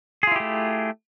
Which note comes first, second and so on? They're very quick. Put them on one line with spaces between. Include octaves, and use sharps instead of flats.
G#4 F4 E4 G4 A3